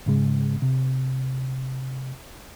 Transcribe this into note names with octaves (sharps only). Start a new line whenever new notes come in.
G#2 C#3 G#3
C3